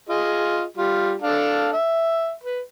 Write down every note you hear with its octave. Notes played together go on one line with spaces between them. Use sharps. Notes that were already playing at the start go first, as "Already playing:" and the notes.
F4 G#4 D#5
G3 F4
D4 A4 F5
E5
B4